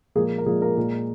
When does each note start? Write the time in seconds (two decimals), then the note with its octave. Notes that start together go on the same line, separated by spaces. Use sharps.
0.15 A#2 F3 G#3 A#3 G#4
0.38 A#4
0.46 A#2 F3 G#3 A#3 G#4
0.61 A#3 A#4
0.77 A#2 G#3